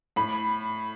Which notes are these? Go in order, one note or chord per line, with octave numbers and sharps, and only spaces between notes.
A2 B5